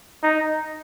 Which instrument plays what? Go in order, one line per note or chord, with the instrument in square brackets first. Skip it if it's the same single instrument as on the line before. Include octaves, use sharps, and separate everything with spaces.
[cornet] D#4